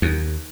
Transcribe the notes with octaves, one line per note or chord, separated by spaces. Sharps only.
D#2